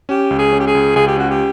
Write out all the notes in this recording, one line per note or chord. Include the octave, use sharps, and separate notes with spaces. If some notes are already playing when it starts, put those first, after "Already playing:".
C#4 G4
C#2
G#4
C#4
G4
G#4
C#2
C#2 G#4
G4
C#4 F#4
G4